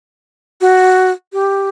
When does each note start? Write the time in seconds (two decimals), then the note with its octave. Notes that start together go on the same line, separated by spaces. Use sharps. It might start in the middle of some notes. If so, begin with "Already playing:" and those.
0.61 F#4
1.33 G4